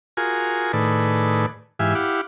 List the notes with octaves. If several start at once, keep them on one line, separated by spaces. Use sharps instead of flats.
F4 F#4 G#4 A#4 G#5
A2 D#3 G#4 A4 B4 D5
G#2 E3 G4 E5 F5 G#5
E4 G4 F5 F#5 D6